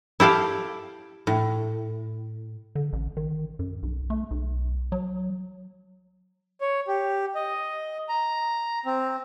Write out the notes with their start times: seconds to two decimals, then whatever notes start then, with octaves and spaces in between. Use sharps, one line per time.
0.20 E4 G4 A4 F5
1.27 A2
2.75 D3
2.93 A1
3.17 D#3
3.59 F#2
3.83 B1
4.10 A3
4.31 B1
4.92 F#3
6.61 C#5
6.88 G4
7.35 D#5
8.09 A#5
8.86 C4